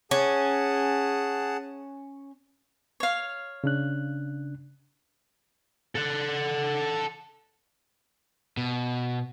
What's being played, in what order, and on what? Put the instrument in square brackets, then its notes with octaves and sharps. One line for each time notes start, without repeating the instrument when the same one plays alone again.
[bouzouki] C#4 [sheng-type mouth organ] G#4 F#5 A5
[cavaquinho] C#5 F5
[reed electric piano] C#3 D4 F#6
[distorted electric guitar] A4 F#5
[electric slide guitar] B2